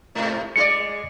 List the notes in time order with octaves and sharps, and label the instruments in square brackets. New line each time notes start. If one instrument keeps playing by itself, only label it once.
[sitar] G#2 C3
[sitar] G#3 F4 D5 [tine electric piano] C#7